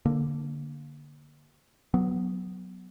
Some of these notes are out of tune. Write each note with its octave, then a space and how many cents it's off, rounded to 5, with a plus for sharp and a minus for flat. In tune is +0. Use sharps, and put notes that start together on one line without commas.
D3 +0 A#3 +0
F#3 +0 B3 +0